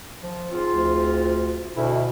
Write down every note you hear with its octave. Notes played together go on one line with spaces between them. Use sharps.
F3
G#2 C4 F4
D2
D2 B2 E4